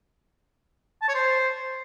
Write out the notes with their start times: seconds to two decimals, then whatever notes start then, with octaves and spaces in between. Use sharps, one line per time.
1.02 A5
1.09 C#5
1.15 C5